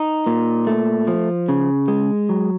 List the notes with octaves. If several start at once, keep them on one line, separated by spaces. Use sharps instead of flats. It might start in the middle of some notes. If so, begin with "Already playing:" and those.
Already playing: D#4
A#2
A3
F3
C#3
G#3
F#3